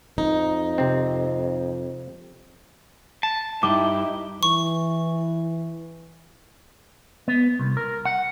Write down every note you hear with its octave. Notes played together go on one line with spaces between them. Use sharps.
F2 D#4
C3 C4
A5
G2 D#4 E4 G4 D6
E3 C#6
B3
C2
A#4
F#5